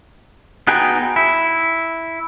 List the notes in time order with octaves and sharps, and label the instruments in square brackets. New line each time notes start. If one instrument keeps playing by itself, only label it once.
[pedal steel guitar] B3 D#4 F#4 G#4 G5
E4